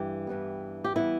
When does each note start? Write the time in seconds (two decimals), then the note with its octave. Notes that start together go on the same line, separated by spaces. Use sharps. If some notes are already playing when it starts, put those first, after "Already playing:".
Already playing: G2 E3 G3 G4
0.27 G2 E3 G3 B3
0.84 G4
0.96 E3 G3 B3 E4